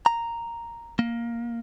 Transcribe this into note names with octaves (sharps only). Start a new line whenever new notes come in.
A#5
A#3